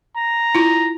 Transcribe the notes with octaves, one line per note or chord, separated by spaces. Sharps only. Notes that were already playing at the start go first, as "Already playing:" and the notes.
A#5
E4 F4